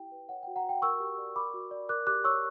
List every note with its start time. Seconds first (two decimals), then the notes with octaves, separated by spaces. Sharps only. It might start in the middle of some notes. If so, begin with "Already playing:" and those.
Already playing: E4 G4 G5
0.12 B4
0.29 C#5 F#5
0.43 F#4 G5
0.56 F#5 A#5
0.64 F#4 G5
0.82 A#4 C#6 E6
1.00 G4
1.18 D5
1.36 A#4 B5 D6
1.54 F#4
1.71 D5
1.89 A#4 D6 F#6
2.07 G4 D6 F#6
2.24 C#5 C#6 E6